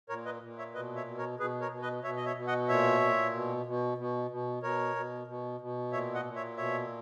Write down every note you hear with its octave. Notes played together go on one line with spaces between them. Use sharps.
A#2 A#4 C#5
B4 D#5
A#2
C#5 E5
B2 B4 D#5
C#5 E5
B2
A#4 C#5
B2 G#4 B4
A#4 C#5
B2
B4 D#5
B2 C#5 E5
D#5
C#5 E5
B2
D#5 F#5
A#2 C#5 E5
A#2
B2
B2
B2
B2
B2 A#4 C#5
B2
B2
B2
A#2 C#5 E5
D#5 F#5
A#2
C#5 E5
B2 C#5 E5